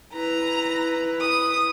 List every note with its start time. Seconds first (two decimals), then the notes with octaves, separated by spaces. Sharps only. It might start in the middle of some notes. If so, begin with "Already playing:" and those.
0.13 E4 B4 A#5
1.21 D#6